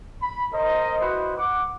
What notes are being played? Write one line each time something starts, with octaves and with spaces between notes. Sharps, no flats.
B5
A#4 C5 D#5
E4 F#4 B4 C5 D#5
F#5 D6